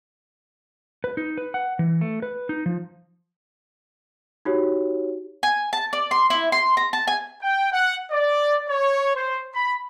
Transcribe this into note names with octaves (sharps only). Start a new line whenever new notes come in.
B4
D#4
B4
F#5
E3
A3
B4
D#4
F3
D#4 F#4 G4 C#5
G#5
A5
D5
C6
E4
C6
A#5
A5
G#5
G5
F#5
D5
C#5
C5
B5